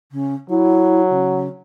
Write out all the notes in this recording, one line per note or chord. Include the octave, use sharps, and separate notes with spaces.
C#3
F#3 E4
C#3